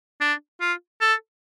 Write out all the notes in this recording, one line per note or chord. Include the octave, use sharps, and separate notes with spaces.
D4
F4
A4